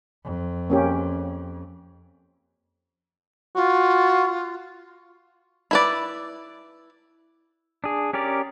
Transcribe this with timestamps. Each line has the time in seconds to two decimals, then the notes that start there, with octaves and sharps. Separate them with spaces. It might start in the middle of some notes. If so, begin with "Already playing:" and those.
0.24 F2
0.70 A#3 C#4 G4
3.55 F4 F#4
5.71 E4 B4 D5
7.84 D4 G#4
8.13 C#4 G4 A#4 D5